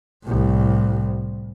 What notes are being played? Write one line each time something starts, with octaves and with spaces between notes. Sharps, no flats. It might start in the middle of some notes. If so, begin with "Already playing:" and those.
C2 A2